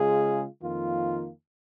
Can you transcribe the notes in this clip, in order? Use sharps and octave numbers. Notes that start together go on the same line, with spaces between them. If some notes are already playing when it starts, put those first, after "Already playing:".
Already playing: C#3 G#3 F4 G#4
F2 D#3 A#3 F4